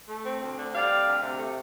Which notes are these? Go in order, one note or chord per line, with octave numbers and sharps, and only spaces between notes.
A3
C4
D2
D3
G3 D5 F5
C4
D2
C3
A3